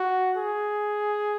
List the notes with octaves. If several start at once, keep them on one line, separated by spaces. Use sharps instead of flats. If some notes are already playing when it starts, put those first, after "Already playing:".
Already playing: F#4
G#4